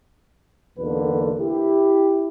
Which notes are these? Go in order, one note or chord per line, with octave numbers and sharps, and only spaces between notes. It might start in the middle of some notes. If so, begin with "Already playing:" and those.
B1 E2 B2 D3 A#3 B4
E4 G4